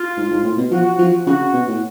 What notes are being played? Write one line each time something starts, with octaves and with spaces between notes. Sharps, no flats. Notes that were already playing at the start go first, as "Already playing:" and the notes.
Already playing: F4
G#2
G#2
A2
B2
F3 F#4
F3
C#3 F#4
B2
A2